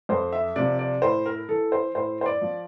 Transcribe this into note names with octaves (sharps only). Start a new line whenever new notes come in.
F2 C5
E5
C3 F3 D5
D5
A2 C5
A#4
E3 A4
C5
A2 C5
C5
D5
F3